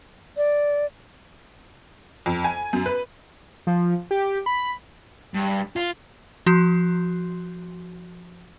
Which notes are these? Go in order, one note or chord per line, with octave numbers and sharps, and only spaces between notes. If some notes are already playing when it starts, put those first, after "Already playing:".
D5
F2
G#5
F#2
B4
F3
G4
B5
G2
F4
F3 F#4 C6 F#6 G6 C7